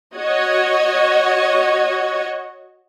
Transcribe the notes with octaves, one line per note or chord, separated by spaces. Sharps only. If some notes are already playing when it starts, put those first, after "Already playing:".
F#4 C#5 D#5 G#6